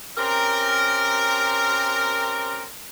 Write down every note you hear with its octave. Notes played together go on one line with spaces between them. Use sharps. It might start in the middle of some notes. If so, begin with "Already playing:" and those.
C4 C#4 G4 A#4